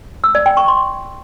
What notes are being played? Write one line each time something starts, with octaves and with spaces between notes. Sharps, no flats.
E6
D5
G5
C#6
C6